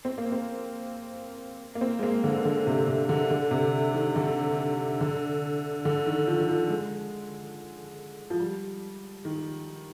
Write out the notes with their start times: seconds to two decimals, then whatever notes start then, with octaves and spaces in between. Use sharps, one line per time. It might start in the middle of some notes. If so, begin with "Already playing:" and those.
0.05 C4
0.18 A#3
0.32 C4
1.75 A#3
1.81 C4
1.99 G#3
2.03 A#3
2.24 D3
2.45 D3
2.67 C3
2.88 C3
3.09 D3
3.30 D3
3.51 C3
3.94 D#3
4.16 D3
5.01 D3
5.85 D3
6.06 D#3
6.27 F3
6.41 D#3
6.49 F3
6.69 G#3
8.30 F3
8.40 G3
9.25 D#3